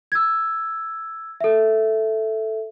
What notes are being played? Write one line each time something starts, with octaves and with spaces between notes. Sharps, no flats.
E6 G#6
A4 E5